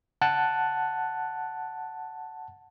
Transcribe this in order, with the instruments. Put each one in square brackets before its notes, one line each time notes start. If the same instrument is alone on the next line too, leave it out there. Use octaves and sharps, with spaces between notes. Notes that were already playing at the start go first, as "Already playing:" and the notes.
[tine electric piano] F#5 A5 F#6